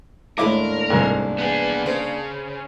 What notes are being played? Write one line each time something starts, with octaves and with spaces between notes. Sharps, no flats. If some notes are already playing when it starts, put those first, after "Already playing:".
D#2 A2 G#3 A#3 D4 E4 A#4 D6
C2 G#2
B3 G#4
C#3 C5